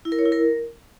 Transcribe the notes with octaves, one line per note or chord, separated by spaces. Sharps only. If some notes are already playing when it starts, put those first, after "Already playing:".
E4
A#4
C#5
E4
A#4